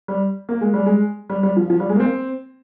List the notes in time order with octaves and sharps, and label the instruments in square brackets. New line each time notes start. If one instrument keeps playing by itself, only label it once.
[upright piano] G3
A#3
G#3
G3
G#3
G3
G3
F3
F3
G3
G#3
A#3
C4